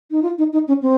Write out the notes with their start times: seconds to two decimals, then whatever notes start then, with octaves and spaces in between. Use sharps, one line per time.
0.11 D#4
0.23 F4
0.38 D#4
0.53 D#4
0.68 C#4
0.82 C4